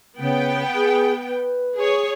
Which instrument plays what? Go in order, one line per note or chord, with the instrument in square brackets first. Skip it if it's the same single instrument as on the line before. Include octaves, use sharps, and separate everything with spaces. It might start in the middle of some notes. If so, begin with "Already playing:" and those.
[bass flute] C#3 [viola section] B3 G5
[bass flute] G#4
B4
[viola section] G#4 C#5